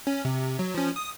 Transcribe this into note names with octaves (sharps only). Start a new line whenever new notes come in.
C#4
C3
F#3
F3 C#4
D#6